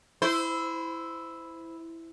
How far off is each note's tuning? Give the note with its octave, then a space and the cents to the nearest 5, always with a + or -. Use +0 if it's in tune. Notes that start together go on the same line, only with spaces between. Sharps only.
E4 +0 C5 -25